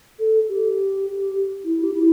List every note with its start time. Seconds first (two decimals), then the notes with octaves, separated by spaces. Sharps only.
0.19 A4
0.49 G4
1.65 E4
1.83 G4
1.94 E4